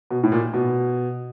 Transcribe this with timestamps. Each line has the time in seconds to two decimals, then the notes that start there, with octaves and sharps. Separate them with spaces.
0.10 B2
0.23 A2
0.32 A#2
0.54 B2